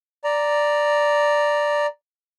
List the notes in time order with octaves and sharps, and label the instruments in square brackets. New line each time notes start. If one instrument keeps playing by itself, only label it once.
[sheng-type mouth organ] D5 A#5